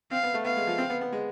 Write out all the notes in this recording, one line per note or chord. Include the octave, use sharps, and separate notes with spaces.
C4 F5
B3
A3
B3 F5
G#3
F3
C4
B3
B3
G#3